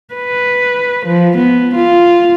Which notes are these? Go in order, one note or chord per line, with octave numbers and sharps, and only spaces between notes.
B4
F3
B3
F4